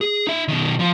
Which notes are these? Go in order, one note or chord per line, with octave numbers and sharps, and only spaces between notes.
G#4
D#4 E5
B2 D#3
F3 F4